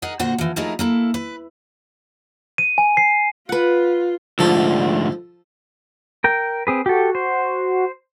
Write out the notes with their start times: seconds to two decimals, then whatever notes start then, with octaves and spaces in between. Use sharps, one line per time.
0.02 D#4 G#4 A#4 F#5
0.19 A#2 D3 F#4 C5 F#5
0.38 E3 F3
0.56 F3 A3 D#4 E4 G#4 A#4
0.79 A#3 E4 A4
1.14 B4
2.58 D#7
2.78 G#5
2.97 C7
3.49 F4 B4 F#5
4.39 D2 G#2 F3 A4
6.24 A#4 G5
6.67 C4 G#4 B4
6.86 F#4 G4 A4
7.15 C5